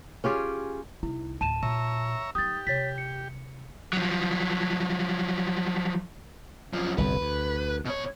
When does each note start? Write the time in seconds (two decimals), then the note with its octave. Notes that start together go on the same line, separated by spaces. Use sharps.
0.24 C#4 F4 G4 G#4
1.03 C2 D#4 E4
1.41 D2 A2 A5 D#7 E7
1.63 A#2 C#5 E5 A#5
2.35 F#3 D#4 G4 D#6 A6
2.67 C3 C#5 A6 B6
2.98 C#7
3.93 F3 F#3
6.73 F#2 F3
6.98 G1 C2 F2 B4
7.21 D2
7.85 B2 C#5